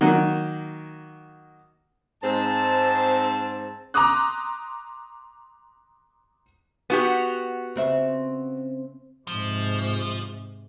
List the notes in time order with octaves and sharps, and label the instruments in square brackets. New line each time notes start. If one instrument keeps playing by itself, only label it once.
[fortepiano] D#3 F#3 A#3
[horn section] G#2 C4 A5
[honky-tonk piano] A#5 C6 D6 D#6 F#6
[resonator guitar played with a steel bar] B3 F#4 G4
[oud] C#3 C4 E5
[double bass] G#2 C3 [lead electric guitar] F3